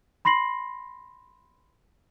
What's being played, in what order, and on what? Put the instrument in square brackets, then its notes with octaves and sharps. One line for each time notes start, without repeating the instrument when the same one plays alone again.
[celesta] B5 C6 A#6 C7 F#7